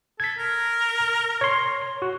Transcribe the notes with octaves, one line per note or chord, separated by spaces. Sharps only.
A4 G#6 B6
A#4
C#5 C6
F#4